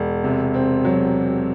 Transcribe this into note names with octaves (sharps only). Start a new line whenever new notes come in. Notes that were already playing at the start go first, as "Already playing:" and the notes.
Already playing: E1
C3
C4
F#3